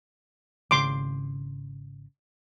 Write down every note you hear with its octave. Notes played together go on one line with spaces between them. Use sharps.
G#1 C#3 C6 D6